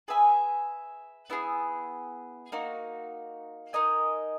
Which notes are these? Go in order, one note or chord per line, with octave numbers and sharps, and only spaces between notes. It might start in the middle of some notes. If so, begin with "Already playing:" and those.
G#4 B4 E5 G#5
B3 E4 G#4
A#3 D#4 F#4
D#4 A#4 D#5 G#5